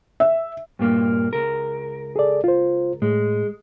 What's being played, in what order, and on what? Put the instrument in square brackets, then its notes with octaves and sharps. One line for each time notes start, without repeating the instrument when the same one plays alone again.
[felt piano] E5
[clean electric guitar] G2 A#2 A#3
C#2 A#4
[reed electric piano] G#4 A4 D5
F4 C5
[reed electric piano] A2 [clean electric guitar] G#3